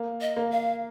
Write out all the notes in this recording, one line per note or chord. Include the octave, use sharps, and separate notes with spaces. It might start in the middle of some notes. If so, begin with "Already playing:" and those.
Already playing: A#3
D#5
A#3
F5